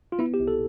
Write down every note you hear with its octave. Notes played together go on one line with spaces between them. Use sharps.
F4
B3 E4
G4
C2
A4